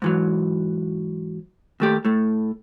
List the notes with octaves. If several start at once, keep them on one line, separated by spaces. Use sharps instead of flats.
G#2 E3 F#3
D#2 A3 G4
A2 A3